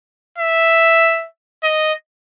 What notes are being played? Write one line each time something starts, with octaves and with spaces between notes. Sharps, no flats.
E5
D#5